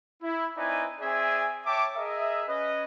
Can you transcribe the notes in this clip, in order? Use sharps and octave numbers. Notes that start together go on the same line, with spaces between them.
E4
C4 D#4 E4 B4 D5 G#5
C4 G#4 D5 E5 G#5
C#5 E5 G5 A5 D6
G#4 A#4 D#5 E5
C#4 B4 D#5